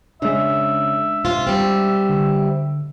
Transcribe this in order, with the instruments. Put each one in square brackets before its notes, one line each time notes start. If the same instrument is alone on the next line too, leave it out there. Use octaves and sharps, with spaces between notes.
[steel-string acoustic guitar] C#3 [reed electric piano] G#3 D4 [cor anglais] E5
[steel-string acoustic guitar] C3 F4
G3 C4
[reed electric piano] D3